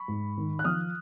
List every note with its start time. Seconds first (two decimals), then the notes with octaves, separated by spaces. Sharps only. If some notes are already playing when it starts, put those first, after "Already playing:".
Already playing: B5 C#6
0.08 G#2
0.37 D#3
0.59 F#6
0.64 F3 D#6 F6